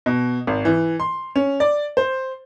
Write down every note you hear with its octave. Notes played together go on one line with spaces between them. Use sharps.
B2
G#1
E3
C6
C#4
D5
C5